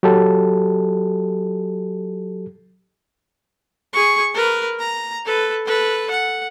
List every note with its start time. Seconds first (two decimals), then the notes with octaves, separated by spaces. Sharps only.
0.03 F#3 G4 A4
3.93 G#4 C#6
4.34 A#4 B4
4.79 A#5
5.25 A4 B4
5.66 A4 B4
6.11 F#5